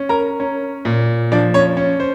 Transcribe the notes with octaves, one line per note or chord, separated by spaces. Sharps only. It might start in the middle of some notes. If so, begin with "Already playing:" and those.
Already playing: C#4
A#4 A#5
C#4
A#2
F3 D4 D5
C#4 C#5
C#4
C5